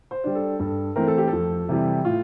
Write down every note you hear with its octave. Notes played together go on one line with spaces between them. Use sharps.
C5
G3 D4
A4
G2 A4
E3 A3 C4 A#4
A4
G4
F2 A4
C3 E3 G3
A2 F4